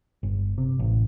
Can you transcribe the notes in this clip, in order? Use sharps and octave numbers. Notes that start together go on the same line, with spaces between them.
G1
C3
A1